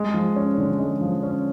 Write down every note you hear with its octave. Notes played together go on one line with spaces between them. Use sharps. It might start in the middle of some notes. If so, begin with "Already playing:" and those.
Already playing: G#3
F3
C#4
D3
G#3
F3
C#4